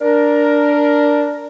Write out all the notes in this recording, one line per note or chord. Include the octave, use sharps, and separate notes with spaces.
D4 A#4